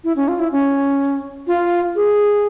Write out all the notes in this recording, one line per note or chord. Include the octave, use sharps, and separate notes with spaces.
E4
C#4
F4
E4
C#4
F4
G#4